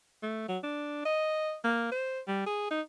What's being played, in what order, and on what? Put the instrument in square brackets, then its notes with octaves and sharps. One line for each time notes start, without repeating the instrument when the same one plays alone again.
[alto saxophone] A3
F#3
D4
D#5
A#3
C5
G3
G#4
D#4